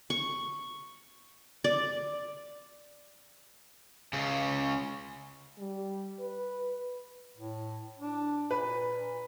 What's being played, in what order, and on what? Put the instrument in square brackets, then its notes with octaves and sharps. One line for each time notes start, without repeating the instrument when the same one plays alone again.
[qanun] C#6
D5
[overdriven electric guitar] C#2 C#3
[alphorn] G3
B4
[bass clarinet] A2
D4
[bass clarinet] A#2 [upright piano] B4